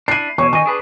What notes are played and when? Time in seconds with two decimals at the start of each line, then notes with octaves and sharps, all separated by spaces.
0.08 D4 E4 C7 D#7
0.38 E2 B2 C#5 C#6
0.53 D#3 D#4 D#5 G#5 C#6
0.66 D4 G#4 B4